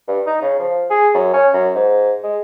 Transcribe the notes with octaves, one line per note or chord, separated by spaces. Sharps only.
G2
D#4
C#3
F3
G#4
F#2
C#4
F#2
G#2
G#3